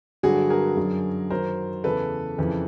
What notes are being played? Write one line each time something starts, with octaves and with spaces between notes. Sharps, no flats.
G2 D3 F#3 F#4 G#4
G#4 A#4
F#2 D3 F#3
F#2 D#3 F#3 A#4 C5
E2 C#3 E3 A4 B4
F2 C#3 E3